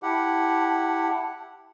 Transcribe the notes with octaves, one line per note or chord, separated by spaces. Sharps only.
E4 G4 F#5 A5